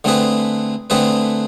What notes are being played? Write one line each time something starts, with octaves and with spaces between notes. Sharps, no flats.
D3 A3 C4 G#4 B4
D3 A3 C4 G#4 B4